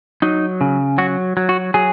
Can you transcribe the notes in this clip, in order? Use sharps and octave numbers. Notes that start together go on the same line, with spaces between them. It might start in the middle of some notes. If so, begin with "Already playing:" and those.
F#3 D#4
C#3
F#3 F#4
F#3
F#4
F#3 G#4